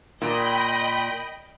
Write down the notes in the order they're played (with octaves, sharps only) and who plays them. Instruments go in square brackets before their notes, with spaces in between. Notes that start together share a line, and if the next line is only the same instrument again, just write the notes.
[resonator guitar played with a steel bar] A#2 [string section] D#5 [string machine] G5 B5